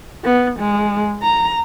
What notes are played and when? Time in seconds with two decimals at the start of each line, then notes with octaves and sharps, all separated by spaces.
0.25 B3
0.59 G#3
1.23 A#5